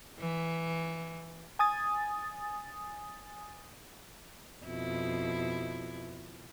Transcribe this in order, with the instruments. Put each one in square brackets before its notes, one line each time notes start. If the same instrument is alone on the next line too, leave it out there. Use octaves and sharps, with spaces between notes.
[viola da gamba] E3
[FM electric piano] G#5 D#6 A6
[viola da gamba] F2 B2 E4